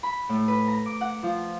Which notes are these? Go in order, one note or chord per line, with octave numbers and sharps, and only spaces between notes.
B5
A2
B4
A#5
D6
F#5
F3